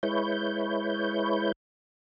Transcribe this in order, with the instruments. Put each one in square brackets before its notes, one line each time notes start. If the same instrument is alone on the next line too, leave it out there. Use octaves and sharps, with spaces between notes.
[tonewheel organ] G#3 E4 B4 C#5 G6